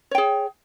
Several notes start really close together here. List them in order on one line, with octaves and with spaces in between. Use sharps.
C#5 G5 G#4